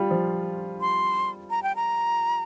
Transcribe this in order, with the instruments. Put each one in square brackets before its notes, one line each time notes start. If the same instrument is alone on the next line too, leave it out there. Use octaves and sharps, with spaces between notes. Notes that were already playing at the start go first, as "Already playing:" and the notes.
Already playing: [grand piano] G3 F4
F3
[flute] C6
A#5
G5
A#5